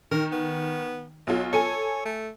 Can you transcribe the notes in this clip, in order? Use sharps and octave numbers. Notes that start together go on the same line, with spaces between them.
D#3 A#4
B3
B1 F#3 F4
A4 C#5 G#5
A3